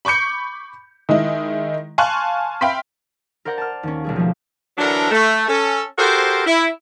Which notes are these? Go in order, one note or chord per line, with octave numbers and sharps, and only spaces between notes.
B5 C#6 D6 G6 C#7
D#3 G#3 D#4 E4
F5 G#5 A5 C6 C#6 F#6
E5 F5 G5 B5 C6 B6
A#4 C5 D5 F#5 G6 A#6
A5 F6
D#2 C#4
B1 G3 G#4
F3 A3
D3 E3 F#3 D4 A4 A#4
A3
C#4 A4
F#4 G4 A4 A#4 C5
E4